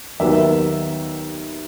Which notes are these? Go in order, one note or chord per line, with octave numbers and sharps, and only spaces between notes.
D#2 D#3 F#3 B3 E5